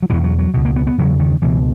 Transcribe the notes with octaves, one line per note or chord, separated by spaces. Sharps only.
F#3
E2 B2 E3
F#3
F#3
C#2 B2
A#3
B3
B3
E2 C#3 F#3
D#3
C#2 B2 E3